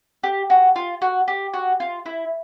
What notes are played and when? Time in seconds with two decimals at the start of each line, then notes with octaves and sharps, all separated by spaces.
0.24 G4
0.50 F#4
0.76 F4
1.02 F#4
1.28 G4
1.54 F#4
1.80 F4
2.06 E4